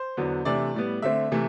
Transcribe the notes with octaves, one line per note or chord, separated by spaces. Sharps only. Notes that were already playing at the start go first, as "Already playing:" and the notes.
Already playing: C5
E2 D3 F#3 B3
C3 E3 A3 D4 D5
A2 G3 B3
D3 A3 C4 E5
C3 E3 A3